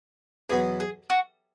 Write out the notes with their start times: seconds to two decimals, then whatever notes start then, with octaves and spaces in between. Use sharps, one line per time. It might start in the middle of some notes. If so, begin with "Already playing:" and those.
0.50 E2 B2 F#3 B3 G#4
0.80 G#4
1.10 F#4